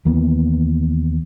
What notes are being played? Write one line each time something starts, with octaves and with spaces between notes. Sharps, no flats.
D#2 E3 A#3 B3